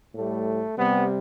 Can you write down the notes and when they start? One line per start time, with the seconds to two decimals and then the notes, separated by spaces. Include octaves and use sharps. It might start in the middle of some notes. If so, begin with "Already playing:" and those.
0.15 A2 G3 A3
0.78 C3 G3 B3